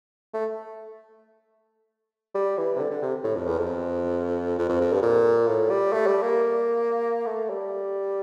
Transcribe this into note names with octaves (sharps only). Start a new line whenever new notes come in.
A3
G3
E3
C3
D3
D3
C3
A2
F2
E2
F2
F2
F2
F2
G2
A#2
A2
G3
A3
G3
A#3
A3
G3